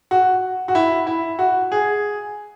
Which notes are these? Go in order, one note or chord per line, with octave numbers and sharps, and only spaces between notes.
F#4
F#4
E4
E4
F#4
G#4